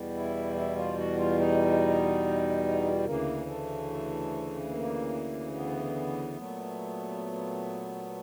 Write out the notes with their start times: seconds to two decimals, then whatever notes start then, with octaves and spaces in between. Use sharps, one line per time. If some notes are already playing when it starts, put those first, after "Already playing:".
Already playing: E2 B2 G3
0.14 E4
0.56 E4
0.76 F4
0.98 F#4
1.19 F4
1.39 D#4
3.04 D2 C#3 E3 A#3
3.46 A3
4.71 A#3
5.54 B3
6.36 A#2 F#3 A3